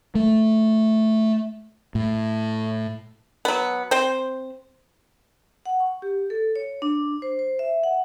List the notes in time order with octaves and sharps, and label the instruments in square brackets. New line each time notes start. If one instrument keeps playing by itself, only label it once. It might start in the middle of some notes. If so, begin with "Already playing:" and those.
[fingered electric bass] A3
A2
[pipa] F#3 B3
C4 C5
[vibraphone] F#5
C#6
G4
A4
C#5
D4
C5
C5
E5
F#5